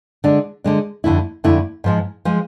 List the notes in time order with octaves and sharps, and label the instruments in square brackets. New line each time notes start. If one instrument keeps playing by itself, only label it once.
[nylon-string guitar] D3 G#3 D4
D3 G#3 D4
F2 D3 A3 E4
F2 D3 A3 E4
G#2 F3 G#3
F3 G#3